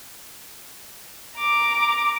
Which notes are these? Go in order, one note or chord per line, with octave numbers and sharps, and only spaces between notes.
A#5 D6